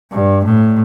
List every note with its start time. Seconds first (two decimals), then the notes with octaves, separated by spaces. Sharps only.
0.12 G2
0.44 A2